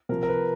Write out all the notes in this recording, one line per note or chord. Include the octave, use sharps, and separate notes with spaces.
C3 F3 A#4
A#4
B4